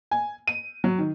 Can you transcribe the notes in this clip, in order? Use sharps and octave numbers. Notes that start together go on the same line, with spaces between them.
G#5
D#7
F#3
D#3